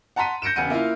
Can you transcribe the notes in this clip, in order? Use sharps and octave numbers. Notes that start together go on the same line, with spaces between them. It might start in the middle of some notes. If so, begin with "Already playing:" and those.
F#5 A5 A#5 C6 B6 D#7
G6 A#6 C#7 D7 E7
E1 C#3 F#5 C#7 D#7
A#3 E4 F4 F5